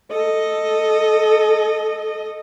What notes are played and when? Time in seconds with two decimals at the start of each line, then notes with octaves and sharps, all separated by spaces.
0.12 A4 D#5